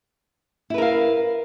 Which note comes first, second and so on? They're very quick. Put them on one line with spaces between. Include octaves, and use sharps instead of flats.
E4 B4 A#4 F5